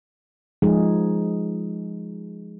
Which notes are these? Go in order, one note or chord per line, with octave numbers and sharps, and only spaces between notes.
F3 G#3 D#4 G#4